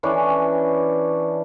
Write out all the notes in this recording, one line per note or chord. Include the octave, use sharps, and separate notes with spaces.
E3 C#4 D4